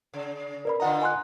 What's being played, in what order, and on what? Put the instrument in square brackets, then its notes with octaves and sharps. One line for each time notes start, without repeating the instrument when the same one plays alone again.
[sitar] C#3
[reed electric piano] A#4 [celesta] B4 D5 B5
[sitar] D3 F4 D#5 [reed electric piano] F#5 A#5
[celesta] G#5 C6 F#6